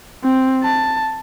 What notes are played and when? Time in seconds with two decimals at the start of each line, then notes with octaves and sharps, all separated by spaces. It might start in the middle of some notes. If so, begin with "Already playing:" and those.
0.24 C4
0.63 A5